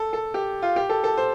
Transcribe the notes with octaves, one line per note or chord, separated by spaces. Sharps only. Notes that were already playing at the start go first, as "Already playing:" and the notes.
Already playing: A4
A4
G4
F4
G4
A4
A4
C5